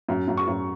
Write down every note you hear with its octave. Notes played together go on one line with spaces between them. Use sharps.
F#2
F#2
C#6
F#2